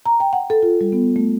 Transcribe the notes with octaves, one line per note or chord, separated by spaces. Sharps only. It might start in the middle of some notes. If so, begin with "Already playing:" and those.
A#5
G5
F#5
A4
F4
G3
B3
A3